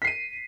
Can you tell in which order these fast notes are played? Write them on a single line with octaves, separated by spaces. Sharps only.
B6 C7 D#7